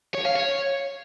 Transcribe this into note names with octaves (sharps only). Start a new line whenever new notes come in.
C#5
F5
C#5